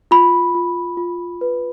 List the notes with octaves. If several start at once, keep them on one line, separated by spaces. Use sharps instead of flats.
F4 B5
F4
F4
B4